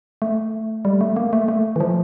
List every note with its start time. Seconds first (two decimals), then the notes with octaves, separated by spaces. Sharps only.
0.22 A3
0.85 G3
1.01 A3
1.16 A#3
1.33 A3
1.48 A3
1.76 E3
1.80 F3